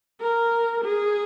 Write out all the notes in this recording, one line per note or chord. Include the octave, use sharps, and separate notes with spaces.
A#4
G#4